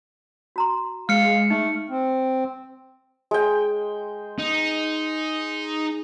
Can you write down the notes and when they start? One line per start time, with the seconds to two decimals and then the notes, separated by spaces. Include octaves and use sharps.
0.56 F#4 A#5 C6
1.09 G#3 F5 F6 C#7
1.50 A3 D#4
1.90 C4
3.31 G#3 G5
4.38 D#4